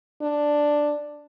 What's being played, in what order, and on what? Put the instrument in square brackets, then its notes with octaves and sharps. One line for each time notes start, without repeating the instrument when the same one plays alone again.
[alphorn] D4